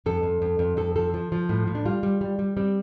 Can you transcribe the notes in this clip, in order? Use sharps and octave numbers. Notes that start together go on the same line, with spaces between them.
F2 A4
F2
F2
F2
F2 A4
F3 A4
F3
F3
A2
A2
D4
G3 F4
G3
G3
G3
G3 C4